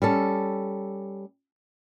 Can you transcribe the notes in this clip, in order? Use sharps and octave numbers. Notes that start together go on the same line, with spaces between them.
G3 C#4 A4